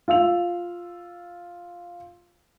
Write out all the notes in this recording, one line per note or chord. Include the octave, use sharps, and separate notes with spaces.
F4 F5 E6 F7